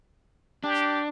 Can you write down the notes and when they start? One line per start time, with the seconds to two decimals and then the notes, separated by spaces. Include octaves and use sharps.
0.64 D4 G4